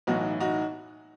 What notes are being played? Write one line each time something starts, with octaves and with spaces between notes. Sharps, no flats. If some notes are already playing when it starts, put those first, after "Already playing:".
B1 A2 E3 D#4 F#4
D#4 F#4